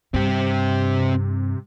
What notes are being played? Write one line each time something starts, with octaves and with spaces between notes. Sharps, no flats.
G2 C3 C4 G4